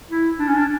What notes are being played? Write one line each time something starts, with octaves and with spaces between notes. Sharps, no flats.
E4
D4
C#4
D4